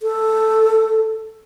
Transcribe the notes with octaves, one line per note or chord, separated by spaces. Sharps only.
A4